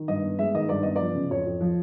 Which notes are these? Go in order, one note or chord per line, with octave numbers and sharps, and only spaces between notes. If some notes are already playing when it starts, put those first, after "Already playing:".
Already playing: D#3
G2 D#5
B3
G#3 E5
D#3 D#5
G2 D5
B3 D#5
F3 D5
C#3
F2 C#5
F2
F3